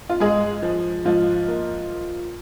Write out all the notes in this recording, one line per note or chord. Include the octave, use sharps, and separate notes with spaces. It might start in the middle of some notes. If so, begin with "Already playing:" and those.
F4
G#2 G#3 G#4
F3
G#2 F3 F4
A#3